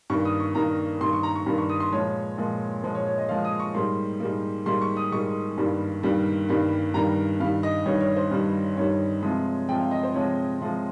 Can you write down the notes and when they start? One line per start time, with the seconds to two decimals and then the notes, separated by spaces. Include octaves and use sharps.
0.10 G2 D#3 A#3 C#6
0.25 D#6
0.40 C#6
0.55 G2 D#3 A#3 A#5
1.01 G2 D#3 A#3 C6
1.13 C#6
1.23 A#5
1.36 C#6
1.46 G2 D#3 A#3
1.58 C#6
1.69 D#6
1.80 C6
1.92 A#2 F3 G#3 C#5
2.38 A#2 F3 G#3
2.83 A#2 F3 G#3 C5
2.95 C#5
3.06 C#5
3.18 D#5
3.29 A#2 F3 G#3 F5
3.44 D#6
3.60 C#6
3.75 G#2 G3 A#3 C6
4.20 G#2 G3 A#3
4.66 G#2 G3 A#3 C6
4.82 C#6
4.97 D#6
5.12 G#2 G3 A#3 C#6
5.58 G2 D#3 G3 A#3
6.03 G2 D#3 G3 A#3
6.49 G2 D#3 G3 A#3
6.94 G2 D#3 G3 A#3 A#5
7.40 G2 D#3 G3 F5
7.63 D#5
7.86 G2 D#3 G3 C#5
8.00 C#5
8.17 C5
8.31 G2 D#3 G3
8.77 G2 D#3 G3 C#5
9.22 C3 F3 G#3
9.69 C3 F3 G#3 G5
9.79 F5
9.91 D#5
10.03 C5
10.14 C3 F3 G#3 C#5
10.60 C3 F3 G#3